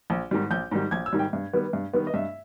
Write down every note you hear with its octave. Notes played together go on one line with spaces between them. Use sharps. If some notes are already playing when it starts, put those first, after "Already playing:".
A#1
G#2 D#3 G3
A#1 G6
G#2 D#3 G3
A#1 G#6
E6
G#2 D#3 G3
G5
G2
D#3 G3 B3
G2
D#3 G3 B3
D#5
G2 E5